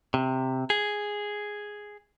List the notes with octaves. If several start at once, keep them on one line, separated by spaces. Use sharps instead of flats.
C3
G#4